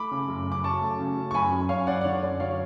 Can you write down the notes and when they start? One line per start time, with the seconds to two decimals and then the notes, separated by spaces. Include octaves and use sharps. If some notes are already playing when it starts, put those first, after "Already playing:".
Already playing: A3 B5 D6
0.11 C#3
0.28 F#2
0.46 C#3
0.52 D6
0.64 F#3 A5 C#6
0.81 A3
0.99 C#3
1.17 F#3
1.31 C#6
1.34 F#2 G#5 B5
1.52 F#2
1.69 F#2 C#5 F5
1.87 F#2 D5 F#5
2.01 D5
2.04 D3 C#5
2.23 F#2 D5
2.40 F#3 C#5 F5